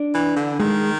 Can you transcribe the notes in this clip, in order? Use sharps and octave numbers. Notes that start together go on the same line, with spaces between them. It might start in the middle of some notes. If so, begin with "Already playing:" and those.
Already playing: D4
E3
D3
D#3 G#3